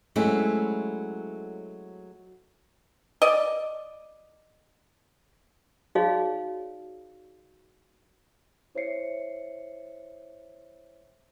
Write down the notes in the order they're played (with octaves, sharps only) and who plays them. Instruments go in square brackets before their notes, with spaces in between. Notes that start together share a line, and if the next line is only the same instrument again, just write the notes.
[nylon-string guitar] F#3 G#3 A3 C4 C#4 E4
[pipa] D5 D#5
[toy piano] D#4 F#4 G#4 C#5 D5 F5
[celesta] E4 C5 C#5 E5 C7 C#7